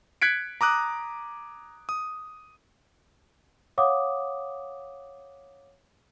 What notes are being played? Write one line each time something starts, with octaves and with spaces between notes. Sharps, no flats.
F#6 G#6 B6 C#7 D7
A#5 D6 D#6 F#6
D#6
C#5 F5 F#5 D6 D#6